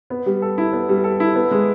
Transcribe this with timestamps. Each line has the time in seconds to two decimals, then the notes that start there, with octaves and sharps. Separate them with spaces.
0.10 B3
0.26 G3
0.42 A4
0.58 E4
0.73 B3
0.89 G3
1.04 A4
1.20 E4
1.35 B3
1.51 G#3